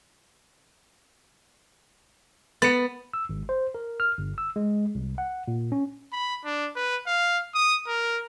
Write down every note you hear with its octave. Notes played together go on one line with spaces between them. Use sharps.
B3 A6 C#7
E6
G#1
C5
A#4
F6
G1
E6
G#3
C2
F#5
A#2
C#4
B5
D4
B4
F5
D#6
A#4